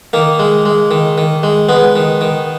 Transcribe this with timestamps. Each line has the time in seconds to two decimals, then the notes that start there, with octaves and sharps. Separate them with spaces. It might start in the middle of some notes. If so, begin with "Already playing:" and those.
0.13 D#3 A#3
0.39 G#3
0.66 G#3
0.91 D#3
1.18 D#3
1.43 G#3
1.69 G#3 B3
1.96 D#3
2.21 D#3